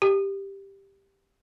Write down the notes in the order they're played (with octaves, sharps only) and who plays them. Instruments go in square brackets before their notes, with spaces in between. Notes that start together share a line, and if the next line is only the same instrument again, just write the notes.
[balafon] G4